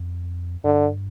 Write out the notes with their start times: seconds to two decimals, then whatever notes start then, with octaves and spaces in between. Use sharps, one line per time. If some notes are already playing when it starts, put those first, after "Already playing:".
Already playing: F2
0.64 G2 D3